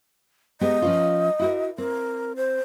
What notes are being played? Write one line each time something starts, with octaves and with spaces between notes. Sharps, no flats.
G#3 B3 G4 D#5
F3 C#4 F4
E4 F#4 A#4
C4 A#4
C5